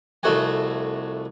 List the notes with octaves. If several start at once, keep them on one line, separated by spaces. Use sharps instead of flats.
C2 F2 A3 F#4 F#5 G#5